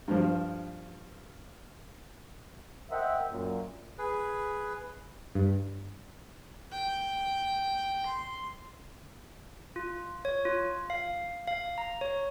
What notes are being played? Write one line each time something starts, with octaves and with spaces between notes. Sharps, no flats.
G2 F3
A#4 C5 D#5 E5 F#5 G5
F#2 A#2
G#4 B4
G2
G5
C6
F4
C#5
F4
F5
F5
A#5
C#5